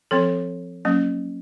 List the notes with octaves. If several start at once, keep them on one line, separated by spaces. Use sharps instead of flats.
F3 C4 A4
F#3 A#3 C#4